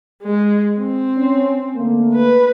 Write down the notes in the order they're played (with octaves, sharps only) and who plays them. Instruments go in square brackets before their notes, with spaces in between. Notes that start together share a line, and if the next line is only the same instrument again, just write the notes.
[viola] G#3
C4
[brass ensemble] C#4
D3 A3 A#3
[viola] B4